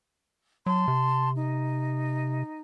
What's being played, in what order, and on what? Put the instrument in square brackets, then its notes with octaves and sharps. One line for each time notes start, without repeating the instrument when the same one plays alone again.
[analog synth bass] F#3 [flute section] A5 C6
[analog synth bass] C3
[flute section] D#4